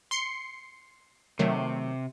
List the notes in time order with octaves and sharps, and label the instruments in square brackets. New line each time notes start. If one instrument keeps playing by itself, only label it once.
[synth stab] C6 C7 C#7
[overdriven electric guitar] C3 [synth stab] D#3 F#3 A3